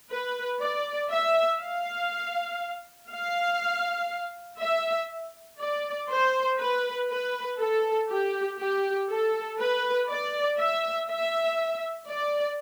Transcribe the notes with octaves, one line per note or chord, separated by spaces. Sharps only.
B4
D5
E5
F5
F5
E5
D5
C5
B4
B4
A4
G4
G4
A4
B4
D5
E5
E5
D5